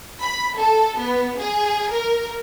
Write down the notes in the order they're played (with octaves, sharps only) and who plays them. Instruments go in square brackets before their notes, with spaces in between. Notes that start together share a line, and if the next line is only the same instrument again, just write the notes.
[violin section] B5
A4
B3
G#4
A#4